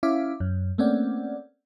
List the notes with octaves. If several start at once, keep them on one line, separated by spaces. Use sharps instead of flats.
C#4 E4 E5 F5 D6
F#2
A3 A#3 C4 C#4 D5 F#5